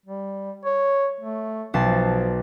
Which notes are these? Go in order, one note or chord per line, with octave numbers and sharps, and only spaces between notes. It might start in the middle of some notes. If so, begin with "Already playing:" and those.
G3
C#5
A3
B1 F3 A5 C7